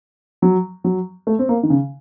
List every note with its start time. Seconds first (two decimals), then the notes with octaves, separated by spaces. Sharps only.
0.42 F#3
0.84 F#3
1.27 A3
1.39 C4
1.49 A#3
1.63 D#3
1.70 C#3